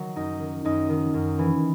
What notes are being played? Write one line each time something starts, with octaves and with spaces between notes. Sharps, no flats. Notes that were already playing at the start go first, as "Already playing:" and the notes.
Already playing: D#3 F#3
F#2 D#4
D#3
F#2 D#4
D#3
F#2
E3